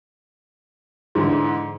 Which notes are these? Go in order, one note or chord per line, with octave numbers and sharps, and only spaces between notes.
G#2 D3 E3